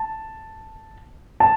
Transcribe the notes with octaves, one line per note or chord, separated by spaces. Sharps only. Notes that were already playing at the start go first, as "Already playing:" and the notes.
Already playing: A5
A5